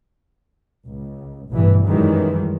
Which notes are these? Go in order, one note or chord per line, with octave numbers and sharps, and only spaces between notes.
C#2
A1 G2 B2 E3
F#2 D#3 E3 G3 G#3